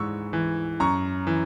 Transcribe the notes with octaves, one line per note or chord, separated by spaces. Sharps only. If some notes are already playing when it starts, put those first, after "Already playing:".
Already playing: G#2 E3 C#6 E6
E3
F#2 A#5 C#6
E3